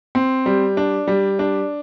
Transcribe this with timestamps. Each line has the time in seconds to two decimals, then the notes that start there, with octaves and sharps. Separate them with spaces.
0.15 C4
0.46 G3
0.77 D4
1.07 G3
1.39 D4